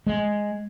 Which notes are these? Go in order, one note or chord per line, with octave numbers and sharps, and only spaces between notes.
G#3